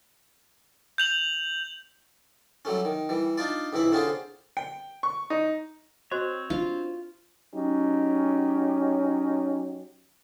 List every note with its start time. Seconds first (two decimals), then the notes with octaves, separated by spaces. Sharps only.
0.98 G6 F7 F#7
2.65 F#3 G3 A3 C#4
2.85 D#3
3.09 E3 G3
3.38 D4 D#4 F4 D5
3.73 C#2 C3 E3 E4 B5
3.92 D3 C4 C#4 F4 G4 G#4
4.57 G5
5.03 C#6
5.30 D#4
6.11 C4 F#4 C5 C#5 D#5
6.50 D4 F4
7.53 F#3 C#4 D#4 G4